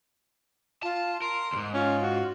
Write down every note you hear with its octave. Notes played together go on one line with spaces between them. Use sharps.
F4 A5
A#4 C6
D#2 G#2
C#4 F4
F#4